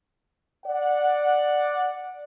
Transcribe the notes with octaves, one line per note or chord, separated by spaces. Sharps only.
D5 F#5